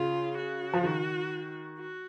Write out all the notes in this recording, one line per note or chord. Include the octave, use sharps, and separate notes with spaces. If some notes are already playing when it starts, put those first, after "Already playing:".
Already playing: C#3 F4
F#4
F3
D#3
F#4